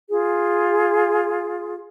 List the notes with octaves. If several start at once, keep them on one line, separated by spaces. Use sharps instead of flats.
F4 G#4